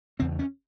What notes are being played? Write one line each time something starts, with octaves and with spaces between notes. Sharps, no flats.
E2 C#3 C4
C#4